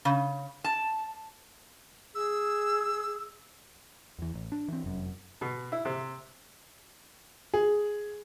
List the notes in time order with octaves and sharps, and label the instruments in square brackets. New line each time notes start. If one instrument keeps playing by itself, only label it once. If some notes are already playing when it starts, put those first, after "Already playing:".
[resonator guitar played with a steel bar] C#3
A5
[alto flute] G#4 [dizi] E6
[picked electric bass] E2 E3
A1
D4
E3 C4
F1 F#2
[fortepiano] B2
E4
C3
[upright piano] G#4